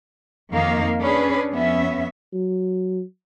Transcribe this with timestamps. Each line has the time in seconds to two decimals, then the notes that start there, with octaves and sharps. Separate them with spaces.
0.52 F2 D#3 A#3 D#4 F5
1.01 C#4 D4 G#4 B4
1.52 F2 B3 C#4 E5
2.33 F#3